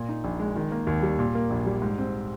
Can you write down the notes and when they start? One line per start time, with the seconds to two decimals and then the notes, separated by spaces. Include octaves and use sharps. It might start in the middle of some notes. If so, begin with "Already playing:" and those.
Already playing: A#2
0.09 D#4
0.24 A#1
0.40 G#3
0.56 D#3
0.72 A#3
0.87 D#2
1.03 G3
1.19 A#2
1.35 A#3
1.50 A#1
1.66 G3
1.82 G#2
1.98 C4